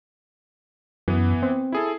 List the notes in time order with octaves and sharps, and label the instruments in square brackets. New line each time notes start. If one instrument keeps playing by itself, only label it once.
[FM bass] F#2 [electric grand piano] E3 B3
[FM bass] C4
[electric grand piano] E4 G#4 A4